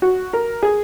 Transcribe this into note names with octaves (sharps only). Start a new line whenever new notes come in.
F#4
A#4
G#4